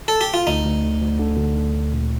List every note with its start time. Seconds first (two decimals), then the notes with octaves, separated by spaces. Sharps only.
0.08 A4
0.21 G4
0.34 F4
0.47 D2 D#4
0.65 D2
0.84 D3
1.01 D2
1.19 D3
1.37 D2
1.56 D3
1.73 D2
1.92 A#2